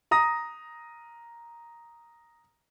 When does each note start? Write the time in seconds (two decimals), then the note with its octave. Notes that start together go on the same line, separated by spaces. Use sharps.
0.11 A#5 D#6 A#6